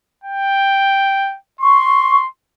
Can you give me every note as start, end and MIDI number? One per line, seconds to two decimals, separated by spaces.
0.24 1.37 79
1.61 2.28 84
1.61 2.19 85